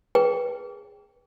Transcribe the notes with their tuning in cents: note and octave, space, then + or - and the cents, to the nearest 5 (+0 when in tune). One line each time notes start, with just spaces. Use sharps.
G#4 -10 B4 -15 G5 +0